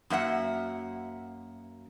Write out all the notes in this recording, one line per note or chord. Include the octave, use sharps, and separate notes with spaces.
F#2 A#3 E5 F#5